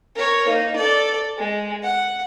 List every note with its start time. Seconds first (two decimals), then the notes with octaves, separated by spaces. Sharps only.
0.15 A#4 C#5
0.47 A#3 D#4
0.76 A4 D5
1.37 G#3
1.83 F#5